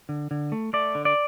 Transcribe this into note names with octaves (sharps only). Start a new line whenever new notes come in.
D3
D3
A3
A3 D5
D3
D5